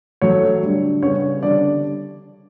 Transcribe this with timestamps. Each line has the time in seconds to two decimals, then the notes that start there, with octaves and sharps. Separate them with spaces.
0.22 A2 F#3 A3 C#5
0.62 D3 G3 D4
1.03 C#3 G3 B3 C#5
1.43 D3 G3 D4 D5